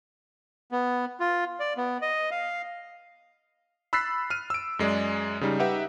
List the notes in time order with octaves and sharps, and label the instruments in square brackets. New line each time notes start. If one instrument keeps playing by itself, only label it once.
[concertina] B3
F4
D5
B3
D#5
F5
[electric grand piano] B5 E6 F#6 A6 B6 C7
F6 D#7
E6 D7
F#2 G#3 G#4 D5
C#3 G3 D#4
D#4 G4 B4 E5 F#5